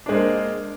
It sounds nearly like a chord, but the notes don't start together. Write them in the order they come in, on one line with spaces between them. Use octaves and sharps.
D4 G#3 C5 A#3